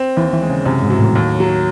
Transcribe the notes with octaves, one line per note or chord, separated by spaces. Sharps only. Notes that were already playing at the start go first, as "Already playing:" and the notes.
Already playing: C4
D#2 E3
E3
G#3
C#3
F#2 C3
G#2
F#3
A2
D#2 A2
F#3